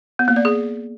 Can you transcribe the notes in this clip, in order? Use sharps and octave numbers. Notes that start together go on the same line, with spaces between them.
B3
A#3
D5
G#4